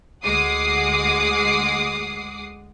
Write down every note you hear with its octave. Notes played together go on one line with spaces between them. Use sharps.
D2 G#3 F#5 D6 D#6 C7